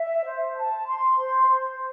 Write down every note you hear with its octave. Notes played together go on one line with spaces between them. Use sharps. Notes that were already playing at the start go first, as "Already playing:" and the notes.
Already playing: E5
C5
A5
C6
C5
C5